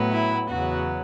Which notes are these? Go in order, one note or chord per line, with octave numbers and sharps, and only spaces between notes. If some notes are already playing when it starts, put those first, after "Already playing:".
Already playing: A2 F#3 B3
E4
E2 C#3 F#3 B3 F#4